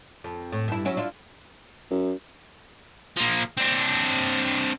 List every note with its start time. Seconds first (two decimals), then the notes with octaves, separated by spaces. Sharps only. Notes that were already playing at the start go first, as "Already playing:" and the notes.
0.24 F2
0.52 A2
0.68 G2 E4
0.85 F#3 C#4 E4
0.97 D4 E4 F4
1.90 F#2
3.17 F3 A#3
3.57 C4 D4